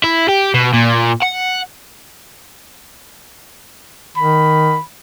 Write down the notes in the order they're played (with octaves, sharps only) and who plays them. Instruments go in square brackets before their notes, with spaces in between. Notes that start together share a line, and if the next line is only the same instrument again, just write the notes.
[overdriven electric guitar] E4
G4
B2
A#2
F#5
[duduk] D#3 [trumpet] B5